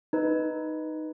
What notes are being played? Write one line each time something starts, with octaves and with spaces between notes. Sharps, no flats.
D#4 B4